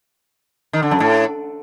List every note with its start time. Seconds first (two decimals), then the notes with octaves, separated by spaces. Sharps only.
0.73 D#3
0.82 D3
0.91 F#2
1.00 A2